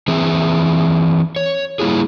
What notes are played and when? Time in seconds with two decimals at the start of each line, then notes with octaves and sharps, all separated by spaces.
0.08 E3 C4 G#4 E5
1.36 C#5
1.79 G3 A#3 E4 F4 G#4